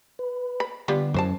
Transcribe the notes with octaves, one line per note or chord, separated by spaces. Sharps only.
B4
B5
D3 G3 B3 F4
F#2 E3 C5 A5